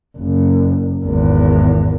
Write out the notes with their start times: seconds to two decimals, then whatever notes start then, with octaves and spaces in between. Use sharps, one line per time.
0.18 F#1
1.03 G#1 E2